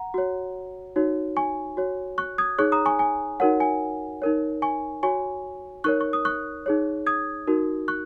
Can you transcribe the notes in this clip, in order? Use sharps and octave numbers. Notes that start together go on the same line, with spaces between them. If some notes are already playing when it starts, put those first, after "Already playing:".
Already playing: F#5 A#5
F#4 C#5
D#4 F#4 C#5
G#5 C#6
F#4 C#5
C#6 F#6
D#6 G#6
D#4 G#4 C#5 C#6 F#6
A#5 D#6
G#5 C#6
G#5
D#4 F#4 A#4 C#5 F#5
G#5
D#4 A#4 C#5
G#5 C#6
F#4 C#5 G#5 C#6
D#4 A#4 C#5 C#6 F#6
C#6
D#6
C#6 F#6
D#4 G#4 C#5
D#6 G#6
D#4 F#4 A#4
C#6 F#6